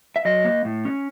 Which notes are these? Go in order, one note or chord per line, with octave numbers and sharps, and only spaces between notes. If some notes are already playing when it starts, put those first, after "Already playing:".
E5
F#3 D#5
A#3
A2
C#4